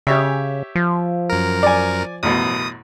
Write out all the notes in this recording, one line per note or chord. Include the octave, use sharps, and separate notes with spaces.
C#3 G4 C#5 E5
F3
F#2 A#4
D5 G#5
A1 F#2 B2 D#6